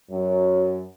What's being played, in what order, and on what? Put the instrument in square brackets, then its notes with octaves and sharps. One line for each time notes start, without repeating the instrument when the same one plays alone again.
[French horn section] F#2